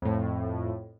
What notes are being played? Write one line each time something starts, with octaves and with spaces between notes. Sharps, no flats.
F2 A2